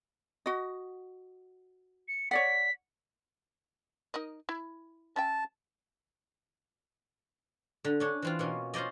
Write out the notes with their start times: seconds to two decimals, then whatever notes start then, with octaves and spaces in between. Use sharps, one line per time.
0.46 F#4 D#5
2.08 C#7
2.31 C#5 D5 F#5 B6
4.14 D#4 A#4 D#5
4.49 E4
5.16 C#4 E5 G5 A5
7.85 D3
8.00 C#4 D4 C#5
8.22 E3 C4 F4
8.39 B2 A#3 C#4
8.74 C#4 F4 C5 D5 D#5